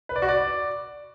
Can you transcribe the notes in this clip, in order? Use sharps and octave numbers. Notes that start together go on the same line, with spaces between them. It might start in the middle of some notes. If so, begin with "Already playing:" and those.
B4
D5
F#4
D5